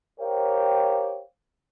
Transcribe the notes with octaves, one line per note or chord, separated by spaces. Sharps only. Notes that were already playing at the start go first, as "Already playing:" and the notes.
G4 A#4 C5 C#5 F5 G5